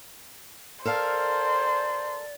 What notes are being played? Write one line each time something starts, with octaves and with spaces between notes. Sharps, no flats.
A4 A#4 C5 D5 F5